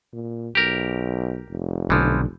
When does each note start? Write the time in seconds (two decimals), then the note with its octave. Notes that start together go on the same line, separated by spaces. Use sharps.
0.13 A#2
0.55 B1 G4 A#4
1.49 F1
1.90 B1 D3 E3 F3